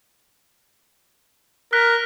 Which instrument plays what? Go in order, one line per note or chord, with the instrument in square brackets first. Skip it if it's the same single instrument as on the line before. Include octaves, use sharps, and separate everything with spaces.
[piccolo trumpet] A#4 [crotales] F6 F#6 B6